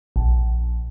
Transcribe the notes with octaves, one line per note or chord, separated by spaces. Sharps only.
A#1